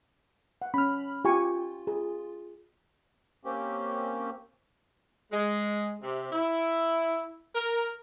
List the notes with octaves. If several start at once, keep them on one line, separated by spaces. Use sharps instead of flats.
F#5
C#4 B5 F6
F4 G4 G#5 C#6
G#4
A#3 C4 C#4 G4
G#3
C3
E4
A#4